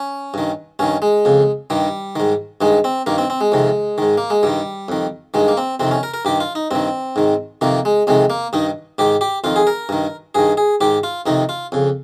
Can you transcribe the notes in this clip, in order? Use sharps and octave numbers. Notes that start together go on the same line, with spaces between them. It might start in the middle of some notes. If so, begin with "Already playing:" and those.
Already playing: C#4
G2 D#3
G2 D#3 C#4
G#3
F2 C#3
G2 D#3 G3
G#2 D#3
G2 D#3 G#3
C4
G2 D#3 A#3
C4
C4
G#3
F2 C3 D#3
G#2 D#3
A#3
G#3
G2 D#3 G3
F2 D#3
G2 D#3 G#3
A#3
C4
F2 C3 D#3 C4
C#4
A#4
A#4
G2 D#3 G4
F4
D#4
G2 D#3 C4
G#2 D#3
F2 C3 D#3 A#3
G#3
F2 C3 D#3 G#3
A#3
G2 D#3 D#4
G#2 D#3 G4
G4
F2 D#3 F4
G#4
A#4
G2 D#3
G2 D#3 G#4
G#4
G#2 D#3 G4
F4
F2 C3 D#3 D#4
F4
F2 C#3